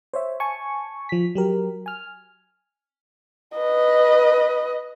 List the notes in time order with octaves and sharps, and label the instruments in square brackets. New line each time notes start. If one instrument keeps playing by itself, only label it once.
[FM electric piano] C5 C#5 E5
G#5 A5 C#6
F3 B6
F#3 G4 A#4
G#5 F6
[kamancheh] B4 D#5